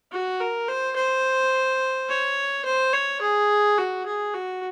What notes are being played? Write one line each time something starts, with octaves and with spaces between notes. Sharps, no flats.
F#4
A#4
C5
C5
C#5
C5
C#5
G#4
F#4
G#4
F#4